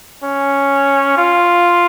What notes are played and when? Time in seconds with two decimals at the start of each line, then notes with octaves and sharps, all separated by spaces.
0.23 C#4
1.17 F4